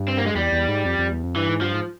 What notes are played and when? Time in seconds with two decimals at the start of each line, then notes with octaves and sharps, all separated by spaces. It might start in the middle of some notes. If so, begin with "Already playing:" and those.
Already playing: G2
0.08 C4
0.18 A#3
0.26 G#3
0.35 E2 G3
0.52 E2
0.69 G#2
0.85 F2
0.99 F2
1.11 E2
1.24 F2
1.36 G2 E3
1.49 G#2
1.61 G2 F3
1.74 G#2